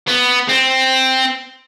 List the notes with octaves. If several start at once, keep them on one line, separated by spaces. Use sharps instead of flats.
B3
C4